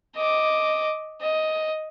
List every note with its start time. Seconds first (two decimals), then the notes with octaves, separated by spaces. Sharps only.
0.16 D#5 D6
1.21 D#5